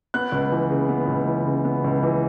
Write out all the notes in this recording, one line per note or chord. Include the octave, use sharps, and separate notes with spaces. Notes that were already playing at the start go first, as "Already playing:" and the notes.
B3 F#6
C#2
E3
C#3
B3
C#2
E3
C#3
B3
C#2
E3